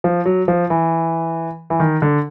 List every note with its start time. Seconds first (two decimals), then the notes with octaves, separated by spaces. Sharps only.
0.04 F3
0.25 F#3
0.48 F3
0.70 E3
1.70 E3
1.80 D#3
2.02 D3